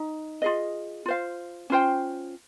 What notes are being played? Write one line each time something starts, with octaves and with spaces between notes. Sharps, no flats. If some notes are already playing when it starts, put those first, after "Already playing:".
Already playing: D#4
F4 G#4 D#5
F4 C5 F5
C#4 F4 C5 G5